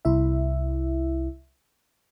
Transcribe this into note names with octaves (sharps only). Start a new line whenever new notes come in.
C2 E4 E5